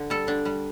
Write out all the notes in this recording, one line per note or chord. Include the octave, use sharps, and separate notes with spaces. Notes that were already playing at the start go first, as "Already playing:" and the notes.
Already playing: D3
G3 A4
D3 D4
G3